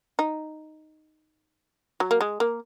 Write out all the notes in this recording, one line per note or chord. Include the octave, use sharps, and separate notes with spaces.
D#4
F#3
A#3
G#3
A#3